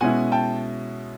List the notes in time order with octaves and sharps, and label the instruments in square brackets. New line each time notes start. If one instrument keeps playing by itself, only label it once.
[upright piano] B2 G#3 C#4 E4 F#5 G#5
G5 A5